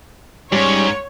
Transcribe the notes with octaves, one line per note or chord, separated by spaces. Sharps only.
G#2 G3 C#4 C#5